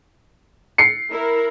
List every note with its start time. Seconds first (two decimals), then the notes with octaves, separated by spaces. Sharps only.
0.78 C7 C#7
1.11 E4 A#4